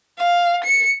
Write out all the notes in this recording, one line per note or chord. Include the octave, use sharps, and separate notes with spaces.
F5
C#7